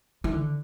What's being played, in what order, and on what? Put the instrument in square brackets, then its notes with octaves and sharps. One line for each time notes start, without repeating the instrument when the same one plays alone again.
[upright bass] E3
D3